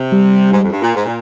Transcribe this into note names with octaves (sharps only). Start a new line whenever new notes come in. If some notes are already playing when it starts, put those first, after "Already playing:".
Already playing: C3
G3
G#2
F2 G#2
G2
A#2
G#2
A#2